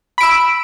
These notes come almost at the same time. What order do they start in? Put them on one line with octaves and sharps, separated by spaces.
B5 D7 E6